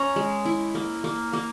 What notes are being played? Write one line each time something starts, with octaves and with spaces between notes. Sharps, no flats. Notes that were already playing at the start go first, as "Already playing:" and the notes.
Already playing: C#4 A#5
G#3
E4
A#3
A#3
A#3